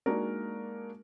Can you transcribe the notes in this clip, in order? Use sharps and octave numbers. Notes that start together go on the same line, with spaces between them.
G#3 A#3 D4 D#4 F#4 A#4